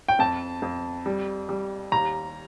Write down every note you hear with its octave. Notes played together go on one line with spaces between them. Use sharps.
G5
F2 A5
F2
G3
G3
D#2 A#5